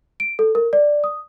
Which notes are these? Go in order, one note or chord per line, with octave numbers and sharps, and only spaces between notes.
D7
A4
A#4
D5
D#6